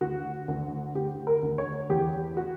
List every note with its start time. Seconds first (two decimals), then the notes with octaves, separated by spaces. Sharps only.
0.01 D2 F#4
0.48 D2
0.95 D2 G4
1.27 A#4
1.43 D2
1.58 C#5
1.90 E2 G4
2.37 F#4